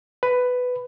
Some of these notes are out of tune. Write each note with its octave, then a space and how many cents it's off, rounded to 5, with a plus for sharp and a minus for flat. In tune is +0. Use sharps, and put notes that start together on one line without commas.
B4 +10